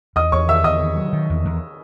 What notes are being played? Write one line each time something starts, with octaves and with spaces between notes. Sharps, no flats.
E2 D#5 D#6
E2 C#5 C#6
D#3 E5 E6
E2 D#5 D#6
D#3
F#3
D#3
E2
E2